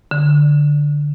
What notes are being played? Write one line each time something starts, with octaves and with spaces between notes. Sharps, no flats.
D3